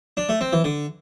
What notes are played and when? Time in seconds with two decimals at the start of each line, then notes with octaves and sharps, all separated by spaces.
0.17 D4
0.29 A3
0.41 C4
0.53 E3
0.64 D3